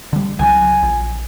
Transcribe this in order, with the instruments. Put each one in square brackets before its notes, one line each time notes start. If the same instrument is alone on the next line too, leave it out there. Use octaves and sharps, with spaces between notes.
[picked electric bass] D3 G3
[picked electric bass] C2 C#3 F#3 [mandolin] G#5
[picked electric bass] A#1